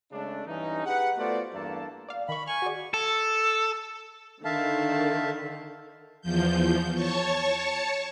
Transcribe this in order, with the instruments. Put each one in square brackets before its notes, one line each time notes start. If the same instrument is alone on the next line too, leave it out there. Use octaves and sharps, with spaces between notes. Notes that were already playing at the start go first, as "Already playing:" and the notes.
[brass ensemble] C#3 G#3 A3 D4
G2 E3 C#4 D#4
G4 G#4 B4 F#5
A3 B3 F4 F#4 C5 D5
E2 G2 A3 A#3 A4 A5
[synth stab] D5 F5
[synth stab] D#3 C#6 [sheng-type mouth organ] B5
[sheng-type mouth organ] G#5 C#6 [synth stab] F6
[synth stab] F#4 G#4 D5
[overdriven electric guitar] A4
[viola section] D3 D#3 [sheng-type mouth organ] E5 F5 A5
[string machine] E2 F3 G6
C#5 A5 C#6